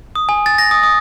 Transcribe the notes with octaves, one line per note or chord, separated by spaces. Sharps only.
D#6
G#5
A6
A#6
D#6
D#6